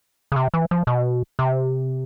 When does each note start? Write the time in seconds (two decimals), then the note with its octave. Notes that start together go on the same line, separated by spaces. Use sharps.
0.32 C#3
0.36 C3
0.54 E3
0.71 F3
0.87 B2
1.39 C3